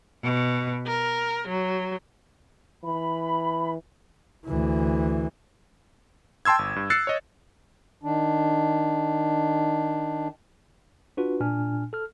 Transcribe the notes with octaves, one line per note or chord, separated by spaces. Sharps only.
B2
A#4
F#3
E3 B5
D2 E3
G5 A5 C6 E6 G#6
G1
G2
E6 F#6 A6 C7 C#7
C#5 D#5
D#3 D4
D4 F4 F#4 B4
A#2 D4 G#5 F6
A4 F6